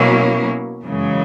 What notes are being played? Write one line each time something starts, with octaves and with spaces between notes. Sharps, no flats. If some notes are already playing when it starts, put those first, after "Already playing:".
Already playing: B2 F#3 A#3 C#4 E4
F#2 C#3 E3 G#3